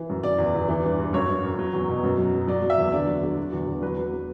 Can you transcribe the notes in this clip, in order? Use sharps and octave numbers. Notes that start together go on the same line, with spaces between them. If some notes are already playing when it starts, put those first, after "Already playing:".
Already playing: E3
F#2
E3 D5
E2
E2
E3
G2
G2
F#2 C#5
F#2
F#2
F#3
E2
B2
F#2
F#3
F#3
F#3 D5
F#3
E5
E2
D3 D5
F#3
D3
F#3
E2
E2
F#3 B4
F#3
F#3